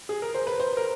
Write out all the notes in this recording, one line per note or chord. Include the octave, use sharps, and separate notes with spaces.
G#4
A#4
C5
B4
C5
A#4